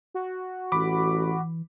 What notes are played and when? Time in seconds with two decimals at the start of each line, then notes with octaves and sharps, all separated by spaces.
0.14 F#4
0.72 A1 E3 B5 D6